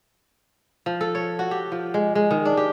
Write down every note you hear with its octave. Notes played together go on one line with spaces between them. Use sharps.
F3
A4
C#5
F#4
G4
F3
G#3
G#3
D#3
D4
G4